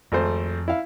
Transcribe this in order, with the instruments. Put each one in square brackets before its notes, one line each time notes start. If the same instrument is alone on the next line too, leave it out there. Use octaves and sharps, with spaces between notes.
[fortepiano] G#1 A3 C5 [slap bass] F2
[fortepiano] E4 F5